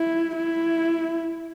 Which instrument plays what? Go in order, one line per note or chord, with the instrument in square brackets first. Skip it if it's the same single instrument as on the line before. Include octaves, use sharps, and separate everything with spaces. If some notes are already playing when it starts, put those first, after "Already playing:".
Already playing: [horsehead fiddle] E4
E4